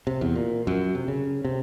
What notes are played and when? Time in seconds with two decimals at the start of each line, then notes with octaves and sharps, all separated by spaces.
0.07 C3
0.21 E2
0.36 A#2
0.67 F#2
0.95 C3
1.08 C#3
1.45 C3